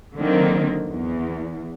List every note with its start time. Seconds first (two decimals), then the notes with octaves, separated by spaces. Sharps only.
0.16 D3 D#3 F#3 A#3 C4
0.88 E2